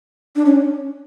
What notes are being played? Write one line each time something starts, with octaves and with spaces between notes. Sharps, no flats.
D4
C#4